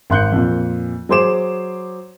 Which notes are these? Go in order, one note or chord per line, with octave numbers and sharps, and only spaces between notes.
G#1 C6 F#6 G6 C#7
F2 A#2
F#3 G#4 C5 C6 D6 E7